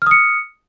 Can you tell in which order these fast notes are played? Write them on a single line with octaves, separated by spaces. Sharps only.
F6 D#6 C#7